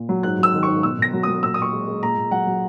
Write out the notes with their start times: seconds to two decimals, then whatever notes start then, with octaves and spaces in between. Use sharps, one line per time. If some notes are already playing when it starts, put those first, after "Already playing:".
Already playing: A#2
0.09 F#3
0.23 G#2 F#6
0.39 F#3 E6
0.54 D#3
0.63 G#2 C#6
0.83 B2 E6
0.99 B2 A#6
1.13 F#3
1.23 F#3 D#6
1.42 A#2 E6
1.54 D#6
1.58 A#2 C#6
1.72 G#3
1.87 G#3
2.02 A#2 A#5
2.17 A#2
2.31 F#3 F#5
2.47 F#3